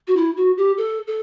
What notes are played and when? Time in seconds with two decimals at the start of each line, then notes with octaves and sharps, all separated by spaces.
0.08 F#4
0.16 E4
0.37 F#4
0.57 G4
0.78 A4
1.07 A4